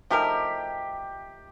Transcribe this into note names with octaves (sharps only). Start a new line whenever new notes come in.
F3 A3 D#4 G4 A#4